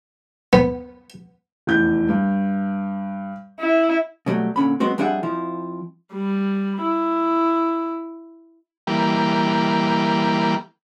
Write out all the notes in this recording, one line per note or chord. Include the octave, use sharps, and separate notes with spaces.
B3
F1 E2 G6
G2
E4
B2 F#3 G3 A3
A#2 D3 C#4 B5
F#3 G#3 B3 C4 F#4
F2 G3 D4 G#4 E5 F#5
F2 F3 E4
G3
E4
E3 G3 A#3